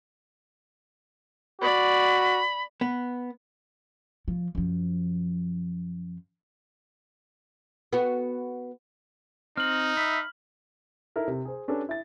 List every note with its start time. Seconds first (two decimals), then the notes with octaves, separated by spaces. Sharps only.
1.61 F#4 D5 B5
2.81 B3
4.28 F3
4.55 F#2 F3
7.93 B3 F#4
9.57 C4 D#4 F6 F#7
9.97 E5 B5
11.16 D#4 E4 A4 A#4
11.28 C3
11.45 G#4 C5
11.68 C#4 D4 G4 A4 B4
11.89 E4 A6